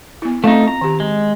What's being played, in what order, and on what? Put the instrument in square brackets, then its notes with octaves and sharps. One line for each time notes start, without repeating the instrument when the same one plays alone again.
[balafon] B3 E4
[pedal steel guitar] A3 D#4 [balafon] C4 F4 F5
[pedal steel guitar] A#5
[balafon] D#3 G4
[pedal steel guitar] G#3